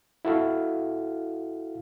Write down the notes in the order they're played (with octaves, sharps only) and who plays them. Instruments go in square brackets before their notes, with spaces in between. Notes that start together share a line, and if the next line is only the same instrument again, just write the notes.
[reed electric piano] E4 F#4 A4 F5